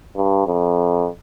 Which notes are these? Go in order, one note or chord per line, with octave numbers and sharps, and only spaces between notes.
G2
F2